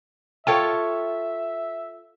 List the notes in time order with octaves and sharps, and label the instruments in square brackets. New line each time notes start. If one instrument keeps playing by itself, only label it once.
[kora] F4 A4 C#5 [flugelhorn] E5 [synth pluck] G5